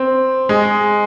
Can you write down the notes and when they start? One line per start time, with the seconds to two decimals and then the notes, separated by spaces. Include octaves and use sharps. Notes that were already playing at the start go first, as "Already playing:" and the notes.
Already playing: C4
0.49 G#3